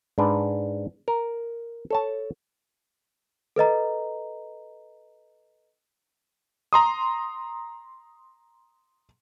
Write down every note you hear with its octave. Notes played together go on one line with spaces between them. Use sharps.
G#2 D4 B4
A#4
A4 C#5 A5
A4 B4 D#5 A#5
A#5 C6 D#6